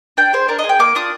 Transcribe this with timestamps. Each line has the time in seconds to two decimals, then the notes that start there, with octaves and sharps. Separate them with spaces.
0.17 D4 G5
0.33 G#4 C5
0.48 D4 A#4
0.59 D#5
0.64 G#4
0.69 G5
0.79 A#3 D6
0.95 D4 F4 D#6